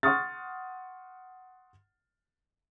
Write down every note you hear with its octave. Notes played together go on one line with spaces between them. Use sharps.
F#5 C6 C#6 D#6 F6 A6